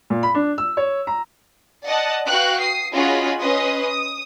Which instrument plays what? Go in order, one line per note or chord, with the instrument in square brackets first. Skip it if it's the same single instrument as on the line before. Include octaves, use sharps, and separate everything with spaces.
[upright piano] A#2
B5
D4
E6
C#5
A#5
[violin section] D5 D#5 F#5 A5
F#4 B4 F5 G5 C#6 F#6
D#6 C7
C#4 F4 F#4 G#4 D#5 B5
C#4 B4 D#5 C6 D#6
D#6